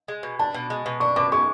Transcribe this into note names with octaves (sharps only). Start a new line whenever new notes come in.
G#3
B2
D4 A5
B2
G#3
B2
D4 C#6
B2 D6
G#3 C#6